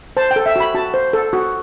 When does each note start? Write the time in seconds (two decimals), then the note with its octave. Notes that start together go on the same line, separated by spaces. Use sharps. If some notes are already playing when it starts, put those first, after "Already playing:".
0.17 C5 A5
0.31 G5
0.36 A4
0.46 E5
0.56 F#4 B5
0.75 F#4 A5
0.94 C5
1.13 A4
1.33 F#4